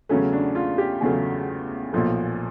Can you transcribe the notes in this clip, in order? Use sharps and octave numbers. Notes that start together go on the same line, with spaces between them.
E2 C#3 F#3 A3 C#4
D4
F4
G4
E2 C#3 F#3 A3 G#4
B1 A#2 F3 A3